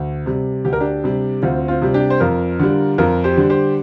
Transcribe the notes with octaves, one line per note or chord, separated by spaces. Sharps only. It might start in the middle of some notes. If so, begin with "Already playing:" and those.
Already playing: D2
C3 G3
D2 G4
A#4
D4 G4
C3 G3
D2 C4 F4
C4 F4
C3 G3
D4 G4
C5
F2 F4 A#4
D3 G3
F2 F4 A#4
G4 C5
D3 G3
G4 C5